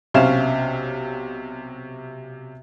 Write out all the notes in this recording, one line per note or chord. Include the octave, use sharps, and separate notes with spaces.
B1 C3 C4 C#4 F5 E7